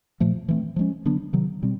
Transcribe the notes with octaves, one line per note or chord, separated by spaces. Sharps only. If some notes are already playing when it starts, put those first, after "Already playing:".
A#2 F3 A3
E3 A3 C4
F3 G#3 C#4
D3 F#3 B3 D4
C3 D#3 F#3
B2 G3 C4